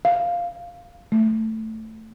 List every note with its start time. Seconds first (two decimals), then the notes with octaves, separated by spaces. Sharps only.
0.05 F5
1.12 A3